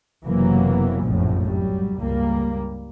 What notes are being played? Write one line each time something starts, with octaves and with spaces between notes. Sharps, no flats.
F#1 C3 E3 F#3 A#3 B3
F1 A#1 F#2 A2 F3
F#3 G3
C#2 G2 G3 A#3